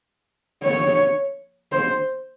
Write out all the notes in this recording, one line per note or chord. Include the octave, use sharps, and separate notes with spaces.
C#5
C5